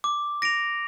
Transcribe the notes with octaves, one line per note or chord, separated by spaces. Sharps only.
D6
A#6 D7 F7